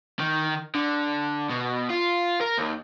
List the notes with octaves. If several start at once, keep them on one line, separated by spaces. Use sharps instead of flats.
D#3
D3
B2
F4
A#4
D#2